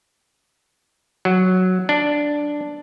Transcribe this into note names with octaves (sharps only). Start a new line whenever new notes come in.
F#3
D4